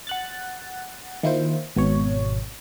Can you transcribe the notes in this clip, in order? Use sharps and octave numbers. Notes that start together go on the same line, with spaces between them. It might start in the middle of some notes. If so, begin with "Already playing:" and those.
F#5 F#6 A6
D#3 A#3 E4 F4 C5
G#1 B2 C#5